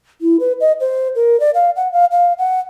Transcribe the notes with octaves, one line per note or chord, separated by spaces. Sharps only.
E4
B4
D#5
C5
A#4
D5
F5
F#5
F5
F5
F#5